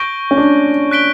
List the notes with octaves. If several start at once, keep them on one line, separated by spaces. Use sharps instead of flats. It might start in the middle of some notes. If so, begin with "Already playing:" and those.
Already playing: C#6 G6 A#6 D7 G7
C#4
D4
F#6 B6 D7 G7